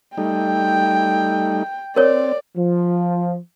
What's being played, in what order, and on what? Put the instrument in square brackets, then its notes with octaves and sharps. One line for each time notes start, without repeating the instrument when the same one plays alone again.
[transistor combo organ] G3 A3 D#4 [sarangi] G5
[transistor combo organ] C4 [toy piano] A#4 C#5 [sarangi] D5
[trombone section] F3